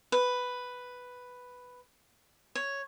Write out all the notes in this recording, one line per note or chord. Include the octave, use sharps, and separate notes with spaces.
B4
C#5